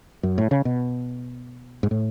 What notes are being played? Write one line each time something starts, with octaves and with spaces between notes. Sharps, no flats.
F#2
A2
C#3
B2
G#2
A2